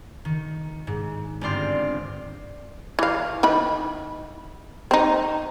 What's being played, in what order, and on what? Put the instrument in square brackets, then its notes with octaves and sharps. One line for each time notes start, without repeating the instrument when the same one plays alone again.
[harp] D#3
G#2
G1 B3 C4 D5 C6 F6
[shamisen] E3 F5
D#3 E3 B5
C4 D#4